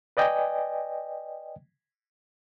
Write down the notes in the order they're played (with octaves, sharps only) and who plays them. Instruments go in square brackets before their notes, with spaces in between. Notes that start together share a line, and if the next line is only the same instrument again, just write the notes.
[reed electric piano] B4 D5 D#5 G5 G#5